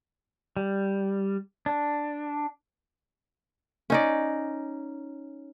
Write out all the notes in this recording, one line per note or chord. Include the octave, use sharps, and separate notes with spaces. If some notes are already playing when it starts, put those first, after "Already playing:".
G3
D4
C#4 D#4 D5